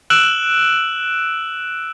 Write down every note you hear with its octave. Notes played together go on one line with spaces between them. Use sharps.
E6 F#6 D7 E7 F#7